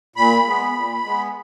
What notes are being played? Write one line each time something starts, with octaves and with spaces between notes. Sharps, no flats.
A#2 B5
G#3 B3
A#2
G#3 B3